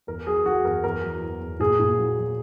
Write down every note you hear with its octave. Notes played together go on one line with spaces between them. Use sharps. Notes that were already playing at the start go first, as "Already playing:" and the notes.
E2 A#4
F#3 G#4
F#3 F#4
E2 A#4
E2 A#4
F#3
E2
E2
A#2 G#4
A#2
F#3
F#3